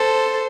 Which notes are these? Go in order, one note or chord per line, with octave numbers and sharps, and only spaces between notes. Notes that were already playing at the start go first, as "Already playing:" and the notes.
Already playing: A4 C5